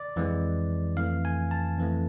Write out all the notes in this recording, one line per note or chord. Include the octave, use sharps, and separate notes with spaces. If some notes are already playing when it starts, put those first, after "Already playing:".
Already playing: D5
F2 E3 G#3
F2 E3 A3 F5
G#5
A5
F2 E3 A3